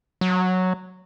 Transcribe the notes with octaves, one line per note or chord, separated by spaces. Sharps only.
F#3